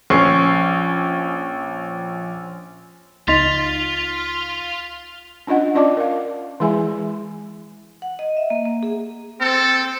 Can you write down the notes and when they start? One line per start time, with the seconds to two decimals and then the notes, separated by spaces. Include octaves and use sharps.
0.10 A#1 C#4 C#6 C7
3.28 C#2 D#4 F4 C6 A6 B6 F7
5.47 C#4 D4 F4 D#5 F#5
5.75 C#4 F4 D5 D#5 A5 D6
5.97 A#4 F5
6.60 E3 G#3 E4 G#4 E5 G#5
8.02 F#5
8.19 D#5
8.37 E5
8.50 A#3
8.66 A#3
8.83 G#4
9.41 C4 A4